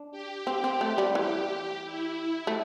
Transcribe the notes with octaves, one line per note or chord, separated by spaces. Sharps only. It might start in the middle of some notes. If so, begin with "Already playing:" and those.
Already playing: D4
G4
C4
C4
A3
G3
E3 G4
E4
A3